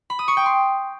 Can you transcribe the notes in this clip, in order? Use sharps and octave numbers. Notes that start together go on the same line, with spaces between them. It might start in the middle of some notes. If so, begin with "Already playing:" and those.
B5
D#6
C#6
G5
C6